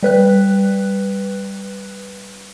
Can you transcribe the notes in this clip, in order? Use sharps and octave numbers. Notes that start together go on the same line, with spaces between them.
G3 B4 F#6